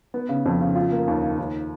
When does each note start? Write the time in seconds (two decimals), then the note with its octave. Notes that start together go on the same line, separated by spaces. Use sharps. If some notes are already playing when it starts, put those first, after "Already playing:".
0.14 B3
0.29 C#3
0.46 F2
0.61 C#3
0.76 F4
0.92 A#3
1.08 D#2
1.22 D#3
1.38 D#2